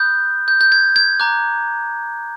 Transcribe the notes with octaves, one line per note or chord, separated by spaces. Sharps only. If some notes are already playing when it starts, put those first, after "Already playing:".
Already playing: B5 D#6 F#6 G6
G6
G6
G#6
G#6
A#5 D6 F#6